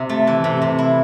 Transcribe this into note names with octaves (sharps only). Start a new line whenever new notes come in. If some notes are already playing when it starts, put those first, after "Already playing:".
Already playing: C3
A3
E3
C3
C3
E4